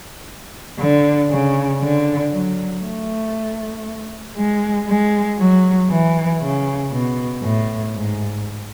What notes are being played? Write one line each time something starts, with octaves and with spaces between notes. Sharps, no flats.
D3
C#3
D3
F#3
A3
G#3
G#3
F#3
E3
C#3
B2
A2
G#2